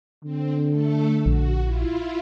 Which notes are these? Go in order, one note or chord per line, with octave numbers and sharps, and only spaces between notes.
D3 C4
A3 A4
A#1 F#4
E4 F4